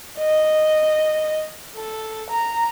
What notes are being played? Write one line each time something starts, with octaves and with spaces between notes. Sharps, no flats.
D#5
A4
A#5